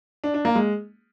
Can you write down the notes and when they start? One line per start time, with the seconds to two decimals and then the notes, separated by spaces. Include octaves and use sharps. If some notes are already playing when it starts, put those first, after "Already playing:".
0.24 D4
0.34 D4
0.45 A#3
0.55 G#3